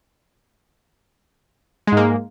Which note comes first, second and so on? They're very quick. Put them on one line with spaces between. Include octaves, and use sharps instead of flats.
G#3 G#2 A#3